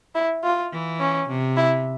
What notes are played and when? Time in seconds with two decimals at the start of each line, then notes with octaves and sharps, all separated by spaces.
0.15 E4
0.44 F4
0.72 E3
1.00 C#4
1.28 C3
1.57 E4